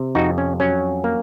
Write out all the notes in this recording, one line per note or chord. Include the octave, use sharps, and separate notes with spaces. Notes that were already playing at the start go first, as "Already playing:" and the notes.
Already playing: C3
F2 D#4 F#4
C#4
F#3 C#4
A#3